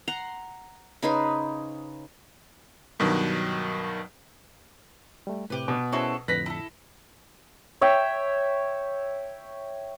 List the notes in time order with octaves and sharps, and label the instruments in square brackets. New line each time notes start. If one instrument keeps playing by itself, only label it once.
[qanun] F#5 A#5 C6
C#3 D#4 B4 C5
[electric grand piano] G2 B2 D#3 F#3
[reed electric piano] G3 A3
[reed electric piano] A2 C3 [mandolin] G4 B4
[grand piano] B2
[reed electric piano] C#4 E4 C5 [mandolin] F#4 G#4 A4
[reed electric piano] F2 A2 D3 [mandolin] B4 [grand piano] A#6 B6
[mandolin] E4 A4
[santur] C#5 E5 G5